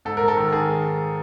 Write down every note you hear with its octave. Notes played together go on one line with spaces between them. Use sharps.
G#2 A4
G#2 A#4
A4
D#3
D#3 G#4